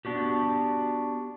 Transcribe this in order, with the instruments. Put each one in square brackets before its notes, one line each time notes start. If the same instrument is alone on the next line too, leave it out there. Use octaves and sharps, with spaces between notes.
[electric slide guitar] B3 D4 F#4 G4